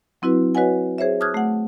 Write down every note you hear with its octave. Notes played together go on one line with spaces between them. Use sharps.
F#3 C4 E4 F#4 B4
F#4 B4 C#5 D#5 F#5 G#5
G#4 C5 C#5 E5
A5 D6 D#6 F6 F#6 G#6
A3 F#5